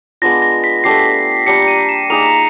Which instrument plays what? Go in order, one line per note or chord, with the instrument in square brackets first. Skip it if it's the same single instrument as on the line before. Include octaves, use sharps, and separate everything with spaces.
[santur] G#3 B3 D4 F4 [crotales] A#6
[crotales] A#6
B6
[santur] A3 D4 G4 [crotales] C7
[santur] G3 A#3 D4 G4 [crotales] C#7
[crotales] D#7
E7
[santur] A#3 D#4 G#4 [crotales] F7